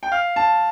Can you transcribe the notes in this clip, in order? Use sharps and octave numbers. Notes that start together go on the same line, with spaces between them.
G5
F5
A5